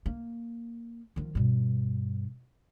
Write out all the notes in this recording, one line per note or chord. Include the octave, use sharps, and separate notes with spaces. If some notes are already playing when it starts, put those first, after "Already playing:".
A#3
D#3 F3
G2 B2